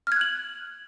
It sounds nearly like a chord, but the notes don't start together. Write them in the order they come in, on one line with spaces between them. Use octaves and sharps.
F6 G#6 F#6 F#7